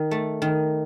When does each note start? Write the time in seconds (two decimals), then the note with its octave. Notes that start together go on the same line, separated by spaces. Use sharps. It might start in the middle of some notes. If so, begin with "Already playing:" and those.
Already playing: D#3
0.11 A3
0.42 D#3